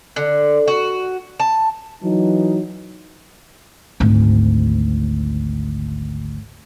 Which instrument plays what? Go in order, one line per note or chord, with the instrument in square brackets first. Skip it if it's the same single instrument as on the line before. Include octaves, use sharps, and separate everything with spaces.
[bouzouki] D3
F#4
A5
[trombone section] E3 F#3 D#4
[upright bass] G#1 D2